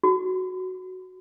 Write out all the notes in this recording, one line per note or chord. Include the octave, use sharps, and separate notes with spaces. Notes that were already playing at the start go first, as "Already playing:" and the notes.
F#4